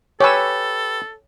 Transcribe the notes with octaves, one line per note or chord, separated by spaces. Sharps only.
G4 A4 B4 C#5 G#5 E6